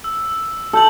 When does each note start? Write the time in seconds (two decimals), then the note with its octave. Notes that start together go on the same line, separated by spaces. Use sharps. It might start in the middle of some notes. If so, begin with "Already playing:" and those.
0.04 E6
0.73 A4 E6 G6 F#7